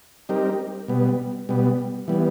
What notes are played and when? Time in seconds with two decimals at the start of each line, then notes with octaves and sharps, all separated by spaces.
0.29 G3 C4 D#4 G4 A#4
0.88 B2 G3 B3
1.49 B2 G3 B3
2.08 E3 G3 B3